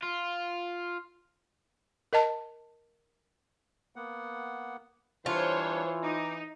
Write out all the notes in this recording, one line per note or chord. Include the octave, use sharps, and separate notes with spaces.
F4
A#4 D#5 A5
A#3 B3 F#5
E3 G3 D4 F4 C5 C#5
D#4 A#5 D6